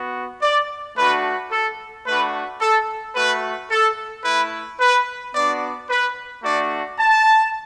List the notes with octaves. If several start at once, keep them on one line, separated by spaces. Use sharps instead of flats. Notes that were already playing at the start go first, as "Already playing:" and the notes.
Already playing: B3 F#4
D5
A3 D4 F#4 B4
A4
A3 D4 F#4 B4
A4
A3 F#4 B4
A4
A3 E4 B4
B4
B3 D4 F#4 D5
B4
A3 D4 F#4 D5
A5